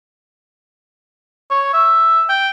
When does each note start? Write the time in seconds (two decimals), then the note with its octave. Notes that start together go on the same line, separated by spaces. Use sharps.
1.51 C#5
1.74 E5
2.29 G5